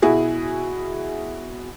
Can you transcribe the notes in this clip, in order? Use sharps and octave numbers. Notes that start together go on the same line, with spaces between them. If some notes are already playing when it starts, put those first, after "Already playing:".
B2 E4 F#4 G#4